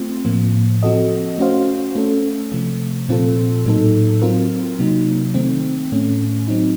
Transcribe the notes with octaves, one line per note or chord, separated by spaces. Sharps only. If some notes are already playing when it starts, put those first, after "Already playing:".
Already playing: A3 C4 F4
A2 F3 A#3
F3 C4 F#4 A4 D#5
A3 C#4 F#4 C5 F5
A3 C#4 A4
C3 F3 A3
A#2 F3 C4 F4 A4
A2 F#3 A#3 D#4 A4
F#3 C4 F4 A#4
C3 F#3 A#3 D#4
D#3 A3 C4
A2 A3 C#4
F#3 C4 D#4